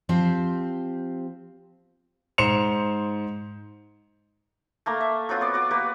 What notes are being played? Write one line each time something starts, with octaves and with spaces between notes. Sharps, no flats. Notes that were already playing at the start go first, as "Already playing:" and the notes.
F3 C4 G4 C5
G#2 C5 C6 C#7 E7 F7
A3 A#3 A#4
E5
F#3 C4 F4 F#4
B3 D5
F#4 D5
A#3 F#4 G4 B4